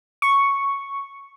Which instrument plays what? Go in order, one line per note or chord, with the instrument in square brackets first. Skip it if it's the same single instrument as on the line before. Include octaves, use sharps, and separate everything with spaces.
[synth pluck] C#6